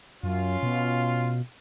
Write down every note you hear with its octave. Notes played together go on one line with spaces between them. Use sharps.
F#2 C#4 F4
B2